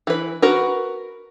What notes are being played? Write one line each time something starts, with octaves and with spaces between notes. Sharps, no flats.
E3 B4
F#4 A#4 B4